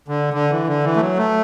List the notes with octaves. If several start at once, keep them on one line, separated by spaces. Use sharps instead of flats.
D3
D3
E3
D3
E3
A3
F#3
A3